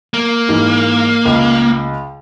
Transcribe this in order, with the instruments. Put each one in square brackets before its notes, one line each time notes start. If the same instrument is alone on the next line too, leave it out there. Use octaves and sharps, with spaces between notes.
[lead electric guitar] A#3
[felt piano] G#2 E3
C#2